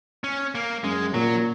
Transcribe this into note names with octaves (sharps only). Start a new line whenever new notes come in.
C#4
A#3
F#2 G#3
A#2 F#3